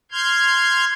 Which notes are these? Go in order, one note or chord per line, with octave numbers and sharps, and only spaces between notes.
C6 F6 G6 G#6